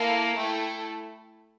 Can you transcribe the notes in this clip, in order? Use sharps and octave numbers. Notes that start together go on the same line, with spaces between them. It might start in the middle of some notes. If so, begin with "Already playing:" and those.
Already playing: A#3 E4 A4
A3 E4 A4 G5